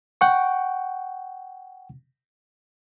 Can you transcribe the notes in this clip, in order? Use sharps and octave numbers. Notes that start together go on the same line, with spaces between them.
F#5 G5 C#6